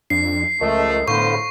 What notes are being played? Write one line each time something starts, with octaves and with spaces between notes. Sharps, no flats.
F2 D4 C7
C#2 C#3 F3 A3 A#4 D#5
A2 D3 B3 A4 C5 F5 B5 C#6